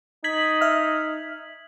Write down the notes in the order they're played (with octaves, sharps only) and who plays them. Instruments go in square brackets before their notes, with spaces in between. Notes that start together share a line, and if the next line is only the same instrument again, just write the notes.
[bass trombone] D#4 [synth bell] G#6 B6 F#7
[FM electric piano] E5 F6